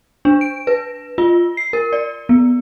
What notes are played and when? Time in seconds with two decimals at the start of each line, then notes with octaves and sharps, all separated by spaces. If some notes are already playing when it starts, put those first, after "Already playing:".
0.25 D4
0.41 D7
0.67 B4
1.18 F4
1.57 C7
1.73 A#4
1.93 D5
2.29 B3